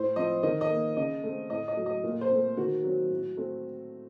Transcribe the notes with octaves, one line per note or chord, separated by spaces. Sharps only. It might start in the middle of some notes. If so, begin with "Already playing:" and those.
Already playing: A2 C5
F3 C4 D#5
D#3 D#5
D#5
A#3
C#3 D#5
A3 C4
A2 D#5
D#5
F#3 A3
D#5
A#2
C5
A3 C4
D#3 F#4
F#3 C4
A2
A3 C4